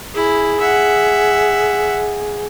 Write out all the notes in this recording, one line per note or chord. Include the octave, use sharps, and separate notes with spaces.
E4 G#4
E5 F#5